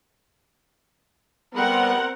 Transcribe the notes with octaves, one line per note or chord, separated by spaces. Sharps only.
G3 B3 C4 A#4 F#5